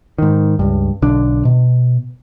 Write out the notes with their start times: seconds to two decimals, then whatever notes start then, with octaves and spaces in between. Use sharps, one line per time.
0.18 G#2 D#3
0.59 C#2 G2
1.02 B1 D3 D4
1.45 B2